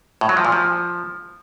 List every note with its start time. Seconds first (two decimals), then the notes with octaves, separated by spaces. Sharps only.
0.21 A2
0.29 F#3
0.37 F3
0.45 A#2
0.52 F3